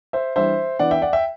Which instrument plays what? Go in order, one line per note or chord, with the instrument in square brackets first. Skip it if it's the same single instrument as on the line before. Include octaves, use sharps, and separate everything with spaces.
[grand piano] C5 E5
E3 G3 D4 C5 E5
E3 B3 D4 D5 F#5
E5 G5
D5 F#5
E5 G5